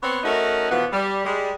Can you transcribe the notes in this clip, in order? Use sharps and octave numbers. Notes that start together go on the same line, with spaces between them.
B3 C4 C#5
A3 C#4 D#4 F#4 A#4
B2 E3 F3 B3
G3
G3 G#3